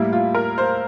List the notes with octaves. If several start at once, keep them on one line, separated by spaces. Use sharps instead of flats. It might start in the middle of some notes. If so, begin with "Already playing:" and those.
Already playing: A2 G3 A#3 E4
F4
A#4
C5